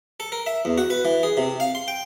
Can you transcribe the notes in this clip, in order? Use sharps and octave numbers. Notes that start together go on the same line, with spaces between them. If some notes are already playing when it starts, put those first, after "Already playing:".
A4
A#4
E5
E2
F#4
B4
E3
G#4
C3
F5
C6
G5